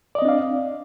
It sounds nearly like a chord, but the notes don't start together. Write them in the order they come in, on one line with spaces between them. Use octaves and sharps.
D5 D#5 C4 D4 F5